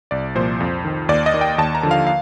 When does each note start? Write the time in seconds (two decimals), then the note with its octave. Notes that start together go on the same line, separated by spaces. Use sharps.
0.11 C2 D5
0.35 A#2 F3 C5
0.60 F2
0.85 D#3
1.09 D#2 D5
1.26 D#5
1.34 D#3
1.41 G5
1.58 D#2 A5
1.75 A#5
1.83 D3 F3
1.91 F5
2.07 F5